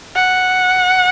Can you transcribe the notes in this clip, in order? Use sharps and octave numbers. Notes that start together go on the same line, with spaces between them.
F#5